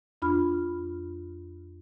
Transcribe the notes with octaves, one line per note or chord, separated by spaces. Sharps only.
F2 D4 F4 B5 F6